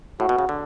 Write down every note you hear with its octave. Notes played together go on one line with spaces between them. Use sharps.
A2 F#4
B2
C#3
D3